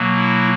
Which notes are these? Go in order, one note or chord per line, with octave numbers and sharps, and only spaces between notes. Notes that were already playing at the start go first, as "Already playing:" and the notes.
Already playing: B2 F#3 A#3
E4